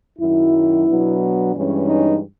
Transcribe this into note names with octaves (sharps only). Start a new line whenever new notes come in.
F#2 D#3 F#3 E4
B2 F#3 B3 D4
G2 E3 G#3 C#4
D#4